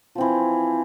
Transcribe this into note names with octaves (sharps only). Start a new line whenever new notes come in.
E3 F3 C4